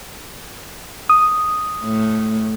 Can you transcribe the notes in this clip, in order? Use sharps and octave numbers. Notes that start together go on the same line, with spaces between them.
D#6
A2